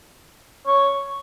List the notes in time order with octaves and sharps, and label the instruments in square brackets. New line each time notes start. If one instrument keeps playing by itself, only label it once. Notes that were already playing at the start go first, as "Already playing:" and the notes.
[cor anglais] C#5